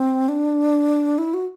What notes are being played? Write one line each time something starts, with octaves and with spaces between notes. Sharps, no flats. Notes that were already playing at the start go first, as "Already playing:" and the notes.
Already playing: C4
D4
E4
F#4